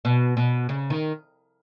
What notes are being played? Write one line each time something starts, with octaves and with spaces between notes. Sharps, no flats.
B2
B2
C#3
D#3